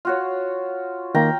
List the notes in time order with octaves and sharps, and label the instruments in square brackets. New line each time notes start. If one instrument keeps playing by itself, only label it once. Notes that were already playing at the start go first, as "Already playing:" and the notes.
[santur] F4 F#4 C#5
[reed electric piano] D#3 A#3 [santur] G5 A#5